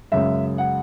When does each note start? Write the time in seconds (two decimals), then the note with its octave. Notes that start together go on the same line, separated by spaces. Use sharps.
0.12 F#2 C#3 G#3 E5
0.58 F#5